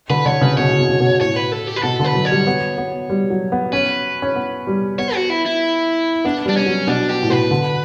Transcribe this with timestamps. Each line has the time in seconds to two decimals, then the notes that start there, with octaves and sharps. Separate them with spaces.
0.10 D3 B4
0.25 D3 C#5
0.41 C#3 B4
0.57 B2 C#5
0.68 C#3
0.79 B2
0.89 C#3
1.00 B2
1.20 A2 C#5
1.36 B4
1.52 A4
1.67 G4
1.76 B4
1.83 B2 A4
1.99 D3
2.05 B4
2.15 F#3
2.25 C#5
2.31 G3
2.47 B3
2.78 B3
3.10 G3
3.30 F#3
3.52 B3
3.72 C#4 B4
4.22 C#4
4.36 B3
4.67 G3
4.99 B3 C#5
5.15 F#4
5.30 E4
5.46 E4
6.25 B3 D4
6.46 G3 D4
6.57 C#4
6.66 F#3
6.87 B2 D4
7.09 G4
7.23 A2
7.29 B2 B4
7.51 D3